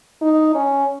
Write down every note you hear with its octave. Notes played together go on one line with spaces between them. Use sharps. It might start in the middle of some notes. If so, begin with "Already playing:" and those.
D#4
C#4